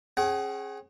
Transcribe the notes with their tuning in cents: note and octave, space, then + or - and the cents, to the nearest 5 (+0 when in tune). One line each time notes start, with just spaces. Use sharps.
C#4 -40 G#4 +0 F#5 +35